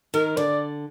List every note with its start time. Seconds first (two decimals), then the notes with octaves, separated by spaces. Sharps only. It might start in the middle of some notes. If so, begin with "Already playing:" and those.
0.14 D#3 A#4
0.37 D3 D5